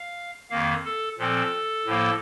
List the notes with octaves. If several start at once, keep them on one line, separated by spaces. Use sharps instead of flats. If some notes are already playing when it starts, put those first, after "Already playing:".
Already playing: F5
F2 D#3 A#3 F5
A4
A#2 F3 C4 A4
A2 F3 A#3